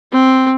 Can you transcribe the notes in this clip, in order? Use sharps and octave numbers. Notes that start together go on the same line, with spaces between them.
C4